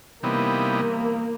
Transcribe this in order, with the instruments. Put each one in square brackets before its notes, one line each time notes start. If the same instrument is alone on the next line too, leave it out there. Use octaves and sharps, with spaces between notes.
[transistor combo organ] C3 E3 G3 B3 D#4 [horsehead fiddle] A#3